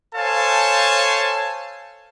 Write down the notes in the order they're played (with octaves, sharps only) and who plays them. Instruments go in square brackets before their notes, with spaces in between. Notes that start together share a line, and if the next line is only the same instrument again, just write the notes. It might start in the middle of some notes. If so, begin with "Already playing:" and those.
[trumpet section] A4 C5 C#5 F5 G#5 A5